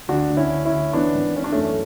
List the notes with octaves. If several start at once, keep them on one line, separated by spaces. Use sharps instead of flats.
D2 D4 F#4
D2
C#4 E4
D2
C#4 E4
D2
E3 B3 D4
G#1
E3 C#4
D4
F#2 A3 C#4